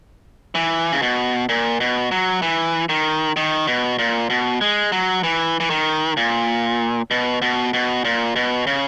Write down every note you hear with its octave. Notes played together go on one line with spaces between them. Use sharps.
E3
C#3
B2
A#2
B2
F#3
E3
D#3
D#3
B2
A#2
B2
G#3
F#3
E3
E3
D#3
A#2
B2
B2
B2
A#2
B2
C#3